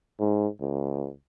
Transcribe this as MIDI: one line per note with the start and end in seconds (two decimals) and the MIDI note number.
0.19 0.47 44
0.61 1.10 37